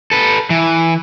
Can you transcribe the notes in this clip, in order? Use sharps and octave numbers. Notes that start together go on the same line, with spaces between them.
A4 B4
E3